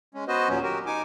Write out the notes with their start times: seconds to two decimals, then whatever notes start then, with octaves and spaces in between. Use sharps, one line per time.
0.14 G#3 C#4
0.28 B3 F#4 B4 C5 D#5
0.48 D#2 A#2 F#3 C#4
0.63 F#4 G4 A#4
0.86 D#4 G#5 D6